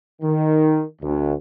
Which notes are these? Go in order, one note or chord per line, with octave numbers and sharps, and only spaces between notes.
D#3
D2